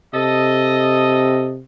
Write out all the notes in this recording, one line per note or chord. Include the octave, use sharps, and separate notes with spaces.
C3 A4 D#5